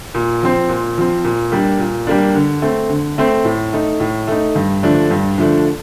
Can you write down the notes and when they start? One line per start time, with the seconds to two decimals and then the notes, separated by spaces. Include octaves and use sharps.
0.14 A#2
0.42 F3 C4
0.69 A#2
0.98 F3 C4
1.24 A#2
1.52 G3 A#3 D4
1.79 A#2
2.07 G3 A#3 D4
2.35 D3
2.62 A3 C4
2.89 D3
3.18 A3 C4
3.45 A2
3.73 A3 D#4
4.00 A2
4.28 A3 D#4
4.55 G2
4.83 D3 F3 A3 D4
5.10 G2
5.38 D3 F3 A3 D4